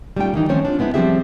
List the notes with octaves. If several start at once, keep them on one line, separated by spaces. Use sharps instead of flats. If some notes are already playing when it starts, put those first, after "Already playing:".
G3 A3 C#4 D#4 F4 G5
D#3 E3 D#4
F3 A3 C4 C#4 C5 C#5
D4 F4
G#3 B3 C4 E4
F3 G3 C4 G4 G#4 E5